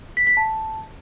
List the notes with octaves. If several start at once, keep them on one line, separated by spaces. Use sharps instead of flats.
B6
B6
A5